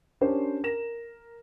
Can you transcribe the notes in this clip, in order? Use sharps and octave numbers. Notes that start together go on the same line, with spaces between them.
C#4 D4 G4 A#4 C5
A#4 A#6 E7